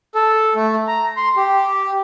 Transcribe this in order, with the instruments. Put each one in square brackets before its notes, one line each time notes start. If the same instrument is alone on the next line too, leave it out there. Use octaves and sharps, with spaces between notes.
[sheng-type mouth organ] A4
A3
A#5
C6
G4